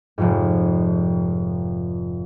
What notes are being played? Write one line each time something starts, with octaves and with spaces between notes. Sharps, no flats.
F1 F2 G#2